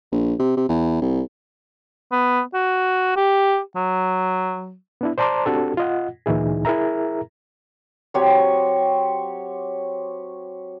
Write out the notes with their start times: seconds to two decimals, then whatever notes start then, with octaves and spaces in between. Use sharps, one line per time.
0.12 A#1
0.39 C3
0.57 C3
0.69 E2
1.02 C2
2.12 B3
2.54 F#4
3.17 G4
3.76 F#3
5.01 B3 D4 E4
5.18 C5 D5 A5 A#5 C6 D6
5.46 C4 D4 F#4 G4 A4
5.77 F4 D#5 F#5
6.26 D2 A#2 E3 D#4 E4 G#4
6.65 E4 G#4 A#4 E5 A#5
8.14 F#3 C4 G4 C#5